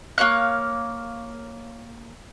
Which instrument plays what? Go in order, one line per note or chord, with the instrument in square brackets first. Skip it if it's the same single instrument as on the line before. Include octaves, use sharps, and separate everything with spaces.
[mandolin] A#3 C#5 F5 F#6